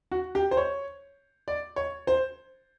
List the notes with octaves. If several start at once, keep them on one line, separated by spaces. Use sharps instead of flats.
F#4
G4
C5
C#5
D5
C#5
C5